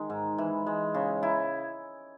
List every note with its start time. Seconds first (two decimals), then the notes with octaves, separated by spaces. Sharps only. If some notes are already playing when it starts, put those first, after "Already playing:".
Already playing: D#3 G#3
0.10 G#2
0.38 E3
0.66 G#3
0.95 C#3
1.23 E4